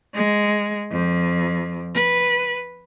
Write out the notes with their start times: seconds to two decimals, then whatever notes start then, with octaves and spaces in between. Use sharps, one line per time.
0.14 G#3
0.91 F2
1.95 B4